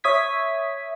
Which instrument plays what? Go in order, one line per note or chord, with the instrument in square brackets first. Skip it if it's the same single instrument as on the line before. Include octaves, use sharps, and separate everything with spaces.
[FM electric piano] C#5 E5 D#6 G#6 B6